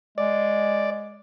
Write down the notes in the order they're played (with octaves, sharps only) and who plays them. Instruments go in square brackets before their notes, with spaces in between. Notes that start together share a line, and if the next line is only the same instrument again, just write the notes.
[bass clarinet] G#3 [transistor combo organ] D5